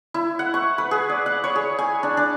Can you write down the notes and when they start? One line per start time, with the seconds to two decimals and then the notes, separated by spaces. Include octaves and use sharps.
0.14 E4
0.39 F#5
0.54 C#6
0.78 B4
0.91 G#4
1.09 D5
1.26 F#5
1.44 C#5
1.55 G#4
1.79 G#5
2.03 D4
2.17 D4